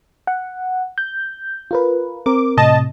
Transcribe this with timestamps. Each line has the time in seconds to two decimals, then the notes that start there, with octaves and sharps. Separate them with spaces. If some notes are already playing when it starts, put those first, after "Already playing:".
0.27 F#5
0.98 G6
1.71 F4 A#4 B4
2.26 C4 A#4 D6
2.57 A2 C3 D#5 A5